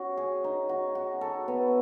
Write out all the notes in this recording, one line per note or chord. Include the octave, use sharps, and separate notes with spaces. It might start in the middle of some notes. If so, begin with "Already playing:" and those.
Already playing: C#4 F#4
G#4
D#4
F#4
F#4
A4
B3